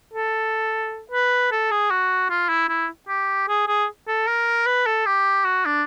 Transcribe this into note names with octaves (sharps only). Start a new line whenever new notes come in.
A4
B4
A4
G#4
F#4
F4
E4
E4
G4
G#4
G#4
A4
A#4
B4
A4
G4
F#4
D4